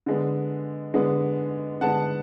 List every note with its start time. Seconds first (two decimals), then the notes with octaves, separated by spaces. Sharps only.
0.06 D3 G#3 B3
0.94 D3 G#3 B3
1.81 D3 G#3 B3 F#5 A5